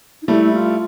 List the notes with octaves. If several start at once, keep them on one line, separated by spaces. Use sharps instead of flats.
D#4
G3 A3 E4
F4